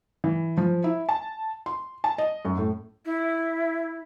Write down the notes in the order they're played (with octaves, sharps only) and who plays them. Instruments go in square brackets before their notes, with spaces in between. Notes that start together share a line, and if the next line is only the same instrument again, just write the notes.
[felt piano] E3
F3
E4
A5
C6
A5
D#5
F#2
A2
[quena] E4